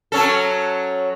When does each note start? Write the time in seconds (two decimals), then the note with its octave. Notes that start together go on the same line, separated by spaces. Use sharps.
0.12 F#3 C#4 A4